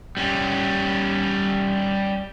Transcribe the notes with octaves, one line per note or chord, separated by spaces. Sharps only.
G3 C#4